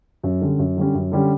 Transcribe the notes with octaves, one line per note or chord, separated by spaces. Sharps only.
F#2
D3 G3 C#4
F#2
D3 G3 C#4
F#2
D3 G3 C#4